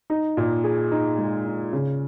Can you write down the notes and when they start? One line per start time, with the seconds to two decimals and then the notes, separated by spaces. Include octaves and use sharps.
0.10 D#4
0.37 A#2
0.64 G#4
0.92 D#4
1.18 G#3
1.46 D#4
1.73 C#3